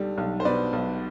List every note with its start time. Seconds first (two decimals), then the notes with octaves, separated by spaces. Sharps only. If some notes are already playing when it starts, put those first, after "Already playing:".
Already playing: B1 G3 A4
0.18 B1
0.40 C5
0.45 B2 B4 D5
0.73 B1